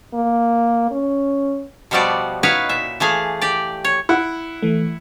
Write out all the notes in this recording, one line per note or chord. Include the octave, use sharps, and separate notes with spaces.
A#3
C#4
B2 F3 G3 B3 F#4 D5
D#4 E4 F#4 B4 C#5 F5
A#2 E5
E3 A3 G#4 F5
G4 D5
C#5
E4 F#5
E3 A3